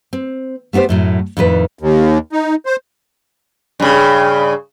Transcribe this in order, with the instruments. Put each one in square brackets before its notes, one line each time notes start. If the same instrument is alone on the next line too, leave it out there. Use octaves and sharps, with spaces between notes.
[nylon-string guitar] C4
A3 B3 F4 G4 C5
F#2 A2 F#3
F2 A2 D#3 B4
[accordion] D#2
D#4
C5
[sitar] G2 C#3